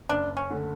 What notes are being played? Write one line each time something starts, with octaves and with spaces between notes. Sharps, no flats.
F#1 D4
C#4
D3 A3